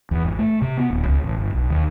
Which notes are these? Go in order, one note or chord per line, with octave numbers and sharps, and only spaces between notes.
E2
G#1
A3
C3
B3
D1
C#2
A1
G1
B1
D#2